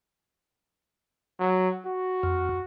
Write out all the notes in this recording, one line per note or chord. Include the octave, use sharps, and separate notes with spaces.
F#3
F#4
F2